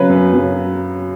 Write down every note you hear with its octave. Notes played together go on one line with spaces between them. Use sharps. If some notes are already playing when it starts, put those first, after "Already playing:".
Already playing: C#3 F#3 B4
F#2
C#3 F#3